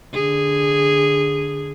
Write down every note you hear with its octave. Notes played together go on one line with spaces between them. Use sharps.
D3 G#4